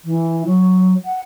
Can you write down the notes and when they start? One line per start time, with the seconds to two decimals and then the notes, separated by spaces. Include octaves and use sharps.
0.05 E3
0.46 F#3
1.05 F#5